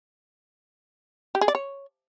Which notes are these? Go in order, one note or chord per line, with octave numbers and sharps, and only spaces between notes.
G4
G#4
D5
C#5